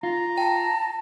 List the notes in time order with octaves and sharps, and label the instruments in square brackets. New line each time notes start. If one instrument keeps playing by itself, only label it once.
[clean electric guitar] F4 [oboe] A#5
[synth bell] G5 [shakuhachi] A5